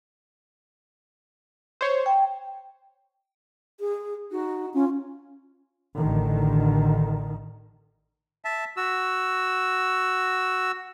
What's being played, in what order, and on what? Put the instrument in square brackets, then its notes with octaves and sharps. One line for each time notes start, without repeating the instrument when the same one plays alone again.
[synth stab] C5 C#5
[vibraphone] G5
[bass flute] G#4
[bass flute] D#4 [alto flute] F#4
[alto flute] C#4 [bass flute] F4
[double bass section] A1 D3 D#3
[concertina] E5 A5
F#4 E6